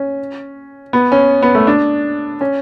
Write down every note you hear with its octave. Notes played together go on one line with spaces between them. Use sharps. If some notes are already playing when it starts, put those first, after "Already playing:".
Already playing: C#4
B3
C#4
B3
A3
D4
C#4